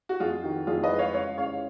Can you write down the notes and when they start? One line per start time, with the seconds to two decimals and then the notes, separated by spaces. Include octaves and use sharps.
0.09 F#4
0.20 F2 F4 G#4
0.43 D#3 F#4
0.67 F2 F4 G#4
0.83 B4 D#5
0.91 G#3
0.99 C#5 F5
1.14 C#3 C#5 F5
1.38 C#3 C#5 F5